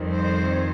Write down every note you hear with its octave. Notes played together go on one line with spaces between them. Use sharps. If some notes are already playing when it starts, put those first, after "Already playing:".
Already playing: F2 D#3 G3 C4
C5